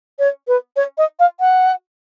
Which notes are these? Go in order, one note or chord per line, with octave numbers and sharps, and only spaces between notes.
C#5
B4
C#5
D#5
F5
F#5